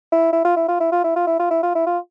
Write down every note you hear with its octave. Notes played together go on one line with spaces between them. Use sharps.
E4
E4
F4
E4
F4
E4
F4
E4
F4
E4
F4
E4
F4
E4
F4